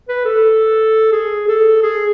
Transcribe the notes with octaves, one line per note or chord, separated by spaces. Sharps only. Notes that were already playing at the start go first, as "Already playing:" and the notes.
B4
A4
G#4
A4
G#4